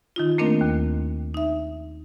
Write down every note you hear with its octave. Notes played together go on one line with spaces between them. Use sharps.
D#3 D#4 F4
A3 A#3 C4 D4 A#4 D#5
D#2
D#4 E5